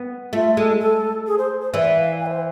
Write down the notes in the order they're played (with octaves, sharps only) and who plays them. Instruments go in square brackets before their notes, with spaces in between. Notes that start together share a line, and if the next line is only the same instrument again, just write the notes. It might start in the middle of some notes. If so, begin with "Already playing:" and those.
Already playing: [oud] B3
[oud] A3 [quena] F4
[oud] G#3 [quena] A4
[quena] A4
G#4
C5
C5
[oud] E3 [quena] D5
[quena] F5
G#5
B4
C5